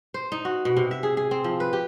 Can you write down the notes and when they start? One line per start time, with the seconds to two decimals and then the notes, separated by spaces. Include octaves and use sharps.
0.14 C5
0.32 D#4
0.45 F#4
0.65 B2
0.77 C3
0.91 E5
1.03 G#4
1.17 G#4
1.31 C4
1.44 F3
1.60 B4
1.73 G4